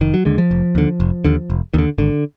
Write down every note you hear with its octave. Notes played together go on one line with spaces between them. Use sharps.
F1 D#3
F#3
D#2 D3 G#3
F3
F1
D#2 D3
F1
D#2 D3
F1
D#2 D3 D#3
G#1 D3